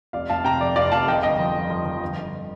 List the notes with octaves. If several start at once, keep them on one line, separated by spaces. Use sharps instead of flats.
F1 D5 F5
F1 F5 A5
C3 G5 A#5
F2 D5
F1 D5 F5
F1 F5 A5
F2 D#5 G5
G1 D#5 G5
F3
F3
F3
F3
G1
G1